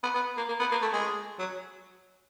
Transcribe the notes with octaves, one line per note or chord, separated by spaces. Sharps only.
B3
B3
A#3
A#3
B3
A#3
A3
G#3
F#3